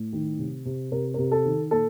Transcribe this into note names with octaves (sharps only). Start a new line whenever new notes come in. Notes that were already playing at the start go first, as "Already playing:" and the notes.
Already playing: A2
D#3
C3
C3
C3 A#4
C3 A#4
A4
D#3
A#2 A4